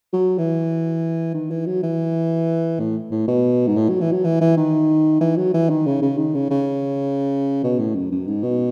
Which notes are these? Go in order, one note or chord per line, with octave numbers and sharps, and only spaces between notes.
F#3
E3
D#3
E3
F#3
E3
A2
A2
B2
G#2
A2
F#3
E3
F#3
E3
E3
D#3
E3
F#3
E3
D#3
C#3
C#3
D#3
C#3
C#3
B2
A2
F#2
F#2
G#2
B2